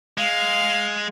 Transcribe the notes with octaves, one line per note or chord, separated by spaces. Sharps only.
G#3 F5